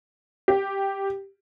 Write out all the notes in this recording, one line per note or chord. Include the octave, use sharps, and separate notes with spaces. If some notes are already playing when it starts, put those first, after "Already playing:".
G4